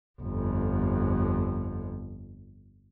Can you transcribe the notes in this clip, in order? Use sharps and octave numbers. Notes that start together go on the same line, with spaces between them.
G1 F2